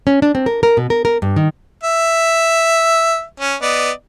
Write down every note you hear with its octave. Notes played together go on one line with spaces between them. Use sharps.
C#4
D4
C4
A#4
A#4
B2
A#4
A#4
G2
D#3
E5
C#4
B3 D5 D#5